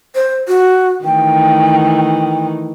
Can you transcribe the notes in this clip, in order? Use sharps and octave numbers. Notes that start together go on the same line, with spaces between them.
C5
F#4
D#3 E3 A3 G5